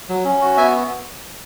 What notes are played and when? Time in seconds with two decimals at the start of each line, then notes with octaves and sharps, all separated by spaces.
0.09 F#3
0.25 C#4
0.41 F#4
0.57 B3 E5 G#5